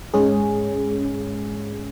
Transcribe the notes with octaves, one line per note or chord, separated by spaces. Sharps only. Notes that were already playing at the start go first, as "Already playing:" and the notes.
G#2 G#3 C#4 G#4